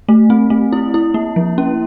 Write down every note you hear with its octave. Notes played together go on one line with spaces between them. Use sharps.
A3
C4
A3
E4
E4
A#3
F3
C#4